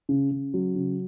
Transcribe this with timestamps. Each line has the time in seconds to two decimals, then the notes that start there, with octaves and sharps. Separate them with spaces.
0.09 C#3
0.31 C#3
0.54 F#3
0.75 C#3